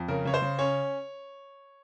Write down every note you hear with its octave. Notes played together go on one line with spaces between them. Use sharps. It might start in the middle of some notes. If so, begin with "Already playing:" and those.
Already playing: F2
C#3 A#4
C#3 C#5
C5
C#3
C#4 C#5